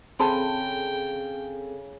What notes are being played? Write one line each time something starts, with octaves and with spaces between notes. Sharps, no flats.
C#3 C4 G#4 A4 G5 A5 B5 C6